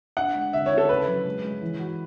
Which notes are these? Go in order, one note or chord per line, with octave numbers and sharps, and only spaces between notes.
D4 F#5
G#3
D3 E5
E4 C#5
A4
C#3 B4
F#3
G#3
G#3
E3
F#4